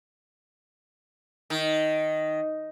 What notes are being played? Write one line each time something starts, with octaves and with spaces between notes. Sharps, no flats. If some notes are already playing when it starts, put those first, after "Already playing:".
D#3